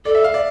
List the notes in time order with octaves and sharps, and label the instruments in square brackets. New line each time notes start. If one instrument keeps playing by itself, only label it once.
[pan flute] A4 [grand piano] D5
[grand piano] E5
F5
D5